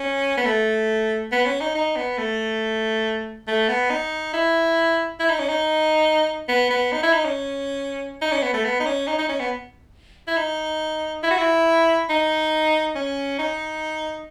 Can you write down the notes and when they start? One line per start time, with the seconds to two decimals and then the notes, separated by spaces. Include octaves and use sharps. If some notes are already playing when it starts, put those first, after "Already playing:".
Already playing: C#4
0.37 B3
0.45 A3
1.32 B3
1.46 C#4
1.60 D#4
1.75 D#4
1.96 B3
2.18 A3
3.47 A3
3.68 B3
3.90 D#4
4.33 E4
5.19 E4
5.29 D#4
5.39 C#4
5.48 D#4
6.49 B3
6.70 B3
6.92 D#4
7.03 E4
7.13 D#4
7.25 C#4
8.21 D#4
8.32 C#4
8.43 B3
8.54 A3
8.65 B3
8.80 D#4
8.86 C#4
9.07 D#4
9.18 D#4
9.29 C#4
9.40 B3
10.27 E4
10.37 D#4
11.23 E4
11.30 F#4
11.38 E4
12.09 D#4
12.95 C#4
13.39 D#4